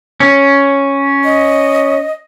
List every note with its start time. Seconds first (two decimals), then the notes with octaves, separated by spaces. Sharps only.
0.20 C#4
1.24 D#5